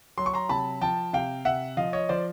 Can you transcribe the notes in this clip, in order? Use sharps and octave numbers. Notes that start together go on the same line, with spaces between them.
F#3 C6
C#6
A#5 C6
C3 A5 B5
F3 G5 A5
C3 F5 G5
C3 E5 F#5
F3 D#5 F5
C#5 D#5
F3 C5 D5